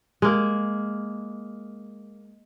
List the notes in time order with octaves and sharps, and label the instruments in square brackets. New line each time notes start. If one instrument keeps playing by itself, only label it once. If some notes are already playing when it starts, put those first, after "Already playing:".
[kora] G#3 A#3